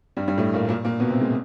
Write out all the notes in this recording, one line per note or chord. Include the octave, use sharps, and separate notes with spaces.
G2 G3
G2 G3
A2 A3
A#2 A#3
A#2 A#3
A#2 A#3
B2 B3
C3 C4
G#3